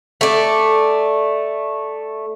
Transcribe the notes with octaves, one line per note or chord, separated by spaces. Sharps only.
A3 D5